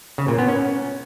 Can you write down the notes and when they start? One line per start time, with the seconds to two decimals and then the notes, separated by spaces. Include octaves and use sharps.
0.18 C#3
0.28 A#2
0.38 B3
0.48 C#4